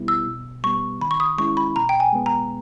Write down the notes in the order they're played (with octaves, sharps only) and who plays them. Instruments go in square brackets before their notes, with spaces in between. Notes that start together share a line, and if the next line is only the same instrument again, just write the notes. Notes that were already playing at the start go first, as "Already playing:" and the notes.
Already playing: [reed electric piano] B2 G3 B3 E4
[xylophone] E6
[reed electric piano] B2
[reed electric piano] G3 B3 [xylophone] C#6
[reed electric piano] D#3 [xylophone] B5
[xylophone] C#6
D#6
[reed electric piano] G#3 C#4 E4 [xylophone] C#6
[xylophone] B5
[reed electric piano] B2 [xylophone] A#5
[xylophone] G5
G#5
[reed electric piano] G#3 B3
[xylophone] A#5